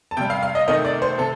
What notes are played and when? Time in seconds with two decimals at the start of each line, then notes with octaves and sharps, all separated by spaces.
0.11 A5
0.17 C3 G3 G5
0.30 F5
0.43 F5
0.55 D#5
0.68 C3 D#3 A3 D#5
0.85 D5
1.02 C5
1.18 C3 A4